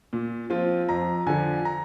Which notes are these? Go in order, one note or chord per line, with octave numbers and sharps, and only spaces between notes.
A#2
F3 C4 F4
F2 A#5
D3 F3 G#5
A#5